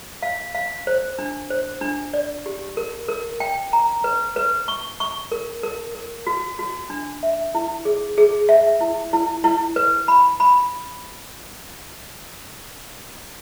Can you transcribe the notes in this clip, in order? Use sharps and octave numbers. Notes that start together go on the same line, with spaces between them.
F5
F5
C5
D4
C5
D4
D5
G4
A#4
A#4
G5
A#5
B4
B4
C#6
C#6
A#4
A#4
A#4
F#4
F#4
D4
E5
E4
G#4
G#4
E5
E4
E4
E4
B4
B5
B5